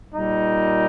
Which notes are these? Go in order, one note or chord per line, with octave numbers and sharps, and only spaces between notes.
A#2 G3 D#4